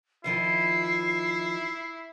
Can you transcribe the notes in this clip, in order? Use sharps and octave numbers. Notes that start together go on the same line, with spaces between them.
F2 D#3 F3 E4 C7